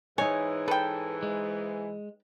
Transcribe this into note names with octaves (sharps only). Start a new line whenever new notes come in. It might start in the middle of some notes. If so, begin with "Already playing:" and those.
G#2 E3 D#4 C#5 G#5
A4 B4 G5
G#3